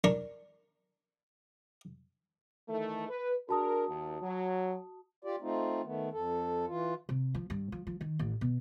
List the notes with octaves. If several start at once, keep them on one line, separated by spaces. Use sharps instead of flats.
D4 A#4 C#6
D#3 E3 A3
B4
D4 F#4 G#4 A#4 A5 D#6
D#2
F#3
F4 G4 D5
A3 C4 D#4 F4
D#3 A3 B3
F2 A4
E3 F4
C3
F3
G2
F3
F3
D#3
A1
B2